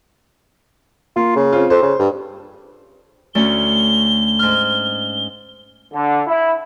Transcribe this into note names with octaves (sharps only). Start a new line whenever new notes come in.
A#3 F4
C#3
C4 F4
F2 C5
C#3
G2
D2 A3 C#4 G7
G#2 F6
D3
E4